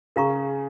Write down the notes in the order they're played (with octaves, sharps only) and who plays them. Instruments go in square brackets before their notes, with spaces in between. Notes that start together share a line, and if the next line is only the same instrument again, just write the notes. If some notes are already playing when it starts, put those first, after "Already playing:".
[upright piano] C#3 [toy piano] A#4 F5 A#5 C#6